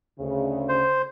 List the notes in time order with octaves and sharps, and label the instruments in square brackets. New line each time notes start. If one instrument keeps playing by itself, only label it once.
[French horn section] D2 C#3
[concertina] C5